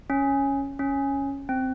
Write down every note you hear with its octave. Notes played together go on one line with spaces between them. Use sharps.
C#4
C#4
C4